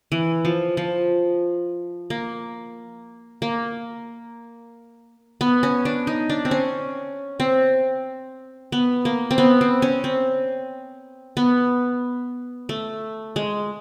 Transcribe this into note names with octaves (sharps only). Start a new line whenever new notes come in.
E3
F3
F3
A#3
A#3
B3
C#4
D4
D#4
D4
C4
C#4
C4
B3
A#3
C4
B3
C4
C#4
C4
B3
A3
G#3